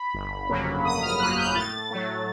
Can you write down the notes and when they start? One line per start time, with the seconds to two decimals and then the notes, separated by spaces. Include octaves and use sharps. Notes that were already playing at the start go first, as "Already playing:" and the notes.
Already playing: B5
0.14 G1
0.49 F2 C#3 F#3 A#3
0.85 G1 D#6
1.03 F6
1.20 F2 C#3 F#3 A#3 F#6
1.38 G6
1.55 A2 A6
1.90 F#3 A3